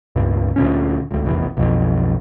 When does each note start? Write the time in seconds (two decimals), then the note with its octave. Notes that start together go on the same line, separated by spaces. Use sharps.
0.16 C#2 G2 A#2
0.56 D2 A#2 C#4
1.11 G#1 D2
1.25 F1 A#1 E2
1.57 B1 F2